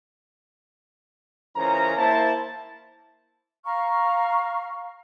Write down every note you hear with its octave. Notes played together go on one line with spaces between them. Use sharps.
C#2 E3 C#4 A#4 C5 A#5
A#3 E4 C5 A5
F5 A#5 C#6 F6